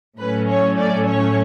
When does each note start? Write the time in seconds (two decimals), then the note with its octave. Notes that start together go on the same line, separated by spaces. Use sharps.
0.19 A2 F#3 A3 C#4 B4
0.49 C#5
0.78 D5
1.09 C#5